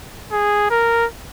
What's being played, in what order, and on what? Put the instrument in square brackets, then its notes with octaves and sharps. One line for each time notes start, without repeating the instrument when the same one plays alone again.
[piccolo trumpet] G#4
A#4